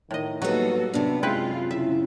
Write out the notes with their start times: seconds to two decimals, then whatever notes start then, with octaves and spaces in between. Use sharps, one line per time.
0.11 A2 D#3 D#5
0.42 F#3 G3 A#3 B3 D#4 F#4 A4
0.94 F#2 C3 B3 D4
1.23 G#3 C4 E4 F4 B4
1.71 C#3 E4 E5